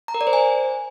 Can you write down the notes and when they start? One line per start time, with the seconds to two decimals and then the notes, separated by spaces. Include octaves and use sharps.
0.08 A#5
0.14 A#4
0.21 D5
0.27 C5
0.33 G#5